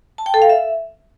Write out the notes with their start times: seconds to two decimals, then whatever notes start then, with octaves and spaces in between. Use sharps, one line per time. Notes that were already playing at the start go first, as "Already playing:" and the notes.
0.18 A5
0.26 G5
0.34 A4
0.42 F5
0.50 E5